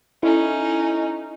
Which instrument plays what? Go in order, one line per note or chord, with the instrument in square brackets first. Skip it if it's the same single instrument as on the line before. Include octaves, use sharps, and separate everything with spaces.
[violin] C#4 D#4 [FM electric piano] E4 [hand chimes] A4 D#5